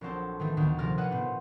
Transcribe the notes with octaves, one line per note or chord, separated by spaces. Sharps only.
A#1 F#3 C4 A4
D#3 E3 A3
D2 A#2 D#3 B3
C3 F3 A#4 F6 A6
G#4 A4 B4 D5 F#5
A#2 B3 C4